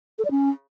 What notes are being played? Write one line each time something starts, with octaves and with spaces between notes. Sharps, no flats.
A4
D5
C#4